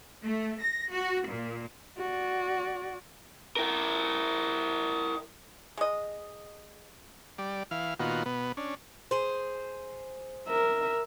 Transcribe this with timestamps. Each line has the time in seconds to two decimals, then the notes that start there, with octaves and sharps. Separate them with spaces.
0.23 A3
0.61 A#6
0.94 F#4
1.26 A#2
1.98 F#4 D5
3.56 E4 A#4
5.77 G#3 D#5
7.38 G3 D5
7.71 E3 F5
8.00 A#2 D#3 B3 F4 F#4
8.26 B2 B3
8.57 C#4 D4
9.11 G#4 C5
10.48 A#4 E5